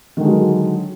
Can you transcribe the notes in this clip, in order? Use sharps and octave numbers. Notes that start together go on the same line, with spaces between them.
D3 D#3 F#3 G#3